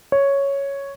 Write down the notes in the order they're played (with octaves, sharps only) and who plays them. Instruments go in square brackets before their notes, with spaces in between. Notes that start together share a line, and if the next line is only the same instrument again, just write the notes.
[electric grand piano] C#5